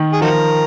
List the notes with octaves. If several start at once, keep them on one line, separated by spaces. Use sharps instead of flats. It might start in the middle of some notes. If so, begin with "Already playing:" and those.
Already playing: D#3
G#4
F3 D#4 F#4 A#4